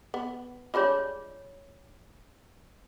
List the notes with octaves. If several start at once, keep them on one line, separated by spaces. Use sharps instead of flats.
B3
G3 G#3 D4 F4 C#5